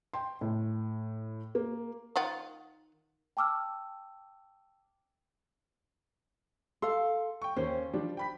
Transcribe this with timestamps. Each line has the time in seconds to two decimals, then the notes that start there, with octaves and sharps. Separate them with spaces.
0.13 G5 C6
0.41 A2
1.55 A#3
2.16 D#3 F4 F#5
3.37 G5 A5 D6 E6 F6
6.82 A4 F5 C6
7.42 G5 C#6
7.57 D#2 A#3 C#4 C5
7.93 F3 G3 D4
8.17 G5 B5 B6